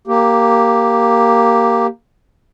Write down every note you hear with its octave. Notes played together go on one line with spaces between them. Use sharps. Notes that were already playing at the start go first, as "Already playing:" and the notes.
A#3 G4